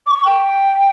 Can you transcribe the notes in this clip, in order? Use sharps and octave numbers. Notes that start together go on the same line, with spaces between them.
D6
C#6
G5